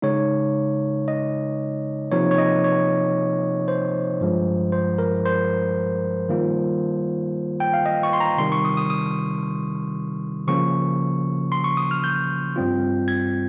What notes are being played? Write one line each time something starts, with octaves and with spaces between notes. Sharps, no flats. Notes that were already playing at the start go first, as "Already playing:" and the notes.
C#3 G#3 D#4 C#5
D#5
C3 F3 A#3 D#4 C#5
C#5
D#5
C#5
C5
G2 F3 G#3
C5
A#4
C5
D#3 G3 A#3 F4
G5
F5
D#5
C#6
C6
A#5
C3 D#3 G3 C6
C#6
D#6
D#6
D#6
C#3 F3 A#3 C#4 C#6
C6
C#6
D#6
F6
G6
G2 G3 C4 F4
G#6